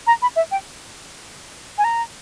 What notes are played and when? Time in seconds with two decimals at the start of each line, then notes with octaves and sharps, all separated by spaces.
0.07 A#5
0.22 B5
0.36 E5
0.51 G5
1.78 G#5
1.84 A#5